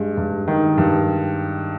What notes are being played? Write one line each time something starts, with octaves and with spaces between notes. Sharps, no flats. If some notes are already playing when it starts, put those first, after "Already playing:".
Already playing: G2 G#3
G2
D#3
G2